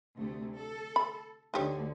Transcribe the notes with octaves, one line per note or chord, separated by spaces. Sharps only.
D2 C3 A3
A4
B5
D2 D3 D#4 G4 C#5